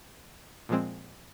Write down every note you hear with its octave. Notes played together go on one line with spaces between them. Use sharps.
A#2 F3 G#3 C4